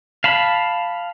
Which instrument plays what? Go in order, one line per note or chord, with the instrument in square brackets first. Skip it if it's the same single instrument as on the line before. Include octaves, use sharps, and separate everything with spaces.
[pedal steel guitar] F5 A5 B5